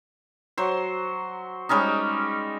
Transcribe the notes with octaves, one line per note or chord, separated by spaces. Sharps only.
F#3 C5
G3 G#3 C#4 D#4